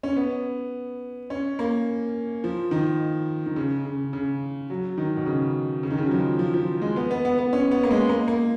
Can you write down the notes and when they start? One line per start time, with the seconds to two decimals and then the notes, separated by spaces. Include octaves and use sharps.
0.03 C#4
0.17 B3
1.30 C#4
1.59 A#3
2.44 F3
2.71 D#3
3.46 D#3
3.56 C#3
3.85 C#3
4.13 C#3
4.70 F#3
4.98 D#3
5.16 B2
5.26 C#3
5.83 C#3
5.90 D#3
5.98 C#3
6.06 F#3
6.11 F3
6.39 F3
6.54 F3
6.81 G#3
6.96 B3
7.11 B3
7.25 B3
7.39 B3
7.53 C#4
7.71 B3
7.83 A#3
7.91 G#3
8.09 A#3
8.28 A#3